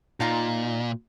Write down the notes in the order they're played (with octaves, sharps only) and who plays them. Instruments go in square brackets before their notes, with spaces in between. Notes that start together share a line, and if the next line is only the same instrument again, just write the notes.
[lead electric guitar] A#2 [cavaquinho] D#4 F4 A#5